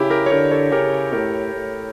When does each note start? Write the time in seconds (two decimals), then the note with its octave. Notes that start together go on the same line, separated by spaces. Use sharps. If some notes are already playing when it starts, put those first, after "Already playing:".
Already playing: C#3 E4 G4
0.10 G4 A#4
0.26 C#5
0.31 D3 G4 A#4
0.51 A4 C#5
0.72 C#3 G4 A#4
1.13 A2 G4 A#4
1.54 A2